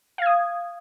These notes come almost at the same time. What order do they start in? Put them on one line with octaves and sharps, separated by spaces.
F5 G#6 D#6